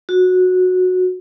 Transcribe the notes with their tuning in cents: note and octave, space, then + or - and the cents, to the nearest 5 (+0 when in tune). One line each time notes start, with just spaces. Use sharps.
F#4 -10